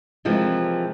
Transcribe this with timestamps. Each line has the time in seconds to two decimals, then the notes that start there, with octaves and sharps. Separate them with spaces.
0.25 C3 E3 F3 G#3 A#3